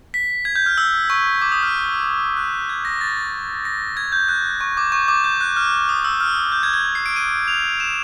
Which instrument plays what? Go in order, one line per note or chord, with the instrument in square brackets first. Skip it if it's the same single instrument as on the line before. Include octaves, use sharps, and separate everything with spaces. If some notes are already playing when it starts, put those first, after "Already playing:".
[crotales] B6
G#6
G6
F6
E6
C#6
D6
D#6
F6
F#6
G#6
A#6
A6
A#6
G#6
G6
F#6
C#6
D6
C#6
D6
G6
F#6
F6
D#6
E6
F6
G6
G#6
G#6
C7
D7
D#7
F7
E7